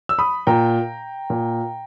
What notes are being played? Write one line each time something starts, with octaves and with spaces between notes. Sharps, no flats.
E6
B5 D#6
A#2 G5 A#5
A#2